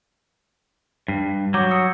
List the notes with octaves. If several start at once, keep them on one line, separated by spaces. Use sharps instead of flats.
G2
F#3 D6 G6
D#6 E6 C#7